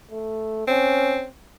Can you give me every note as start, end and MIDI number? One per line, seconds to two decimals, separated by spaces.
0.11 0.67 57
0.68 1.27 60
0.68 1.25 61